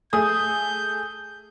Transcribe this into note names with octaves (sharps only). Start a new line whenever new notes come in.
A3 G#4 D#6 G6